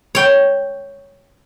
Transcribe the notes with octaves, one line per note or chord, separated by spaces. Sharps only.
C#5 G5